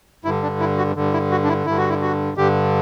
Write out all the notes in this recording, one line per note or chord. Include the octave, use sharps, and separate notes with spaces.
G2 D3 E4
D4
E4
F#4
G2 D3
E4
F#4
D4
E4
G2 D3 E4
F#4
E4
F#4
G2 D3 G4